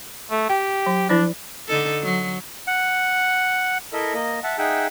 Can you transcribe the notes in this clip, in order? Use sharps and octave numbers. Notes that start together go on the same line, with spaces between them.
A3
G4 G5
F#3
F3 D4 E4 D5
D3 D#4 A4
F#3
F#5
E4 A4 A#4 D#5 E5
A#3 D#5
E5 F#5 A5
D#4 G#4 E5 F#5 G5